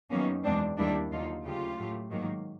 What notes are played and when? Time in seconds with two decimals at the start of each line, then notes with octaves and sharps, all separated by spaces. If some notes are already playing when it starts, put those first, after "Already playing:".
0.11 F#2 D#3 F#3 A#3 B3 C#4
0.44 E2 B2 G#3 C4 D4
0.78 D#2 D#3 G3 A#3 D4 E4
1.11 D#2 D3 F#3 A#3 D#4 F4
1.45 D2 C#3 F#3 A3 F4 G4
1.78 A2 F#3 A3
2.11 G#2 D#3 F#3 A#3